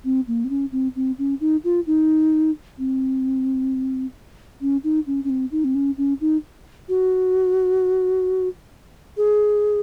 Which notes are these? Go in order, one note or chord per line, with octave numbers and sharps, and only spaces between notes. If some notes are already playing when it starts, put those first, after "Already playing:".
C4
A#3
C4
C#4
C4
C4
C#4
D#4
F4
D#4
C4
C#4
D#4
C#4
C#4
C4
D#4
C4
C#4
C#4
D#4
F#4
G#4